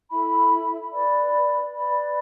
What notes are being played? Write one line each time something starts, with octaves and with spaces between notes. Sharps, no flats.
E4 A4 E5 B5
B4 D5 B5
B4 D5 B5